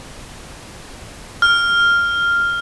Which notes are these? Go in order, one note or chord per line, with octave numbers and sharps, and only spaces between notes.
F6